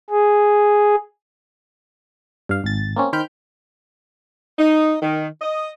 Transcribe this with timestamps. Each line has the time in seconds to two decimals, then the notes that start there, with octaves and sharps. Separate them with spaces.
0.10 G#4
2.49 G2 F5
2.64 G#1 A6
2.96 A#3 C4 C#4
3.13 D#3 C5 G5 B5 F6 G6
4.59 D#4
5.02 D#3
5.42 D#5